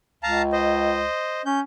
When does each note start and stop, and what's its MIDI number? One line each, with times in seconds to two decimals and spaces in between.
0.23 1.06 37
0.23 0.42 77
0.23 0.42 81
0.23 0.42 82
0.52 1.42 72
0.52 1.42 75
1.46 1.61 61
1.46 1.60 91